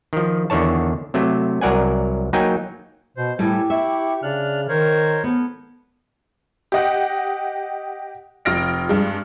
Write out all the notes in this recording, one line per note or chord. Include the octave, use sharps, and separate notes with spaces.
D#3 F3
E2 D3 D#3 C#5 A5
C3 F#3 A3
C2 F#3 A#4 D5 F#5 G#5
F#3 A#3 D#4 G5 G#5
B2 C5
A2 G3 G4 A4 G#5
E4 E5 C#6
C#3 D4 F6 F#6
D#3 A#4 C5 C#5
B3 A4
G4 D#5 F#5
F1 F4 F6 A#6 D7
G2 G#3